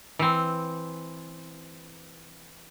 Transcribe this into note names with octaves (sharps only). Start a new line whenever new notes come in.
E3 C4